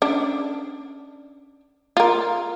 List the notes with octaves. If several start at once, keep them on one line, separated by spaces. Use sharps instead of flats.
C#4 D4
F4 A#4